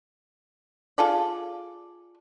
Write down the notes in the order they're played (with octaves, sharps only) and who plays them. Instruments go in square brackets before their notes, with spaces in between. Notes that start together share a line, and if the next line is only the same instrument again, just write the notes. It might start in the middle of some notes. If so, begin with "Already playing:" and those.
[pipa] F4 G#4 A4 D5